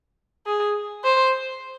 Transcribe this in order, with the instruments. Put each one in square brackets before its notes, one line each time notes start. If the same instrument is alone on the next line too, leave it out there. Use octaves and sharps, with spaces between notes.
[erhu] G#4
C5